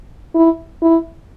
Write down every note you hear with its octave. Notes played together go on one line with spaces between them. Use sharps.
E4
E4